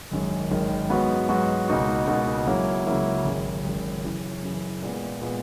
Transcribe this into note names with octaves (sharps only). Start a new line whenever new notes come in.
G#1 F#2 D#3 G#3
G#1 F#2 D#3 G#3
G#2 F#3 B3 F#4
G#2 F#3 B3 F#4
C#2 B2 A#3 D#4 F#4
C#2 B2 A#3 D#4 F#4
C#2 C#3 F#3 A#3 E4
C#2 C#3 F#3 A#3 E4
G#1 F#2 C#3
G#1 F#2 C#3
F#2 C#3 E3
F#2 C#3 E3
A#2 G#3 B3
A#2 G#3 B3